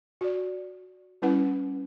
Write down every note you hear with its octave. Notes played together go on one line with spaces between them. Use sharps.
F#4 D5
G3 C#4 E4 B4 F#5